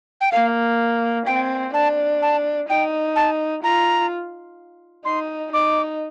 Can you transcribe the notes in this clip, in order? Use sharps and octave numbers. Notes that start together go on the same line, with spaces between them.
G5
A#3 F5
C4 G5
D4 A5
A5
D#4 G5
A5
F4 A#5
D#4 C6
D#4 D6